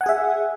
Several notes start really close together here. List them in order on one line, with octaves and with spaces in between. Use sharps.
F#5 G#5 G#4 E5